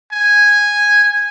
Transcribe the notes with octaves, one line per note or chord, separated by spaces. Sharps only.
G#5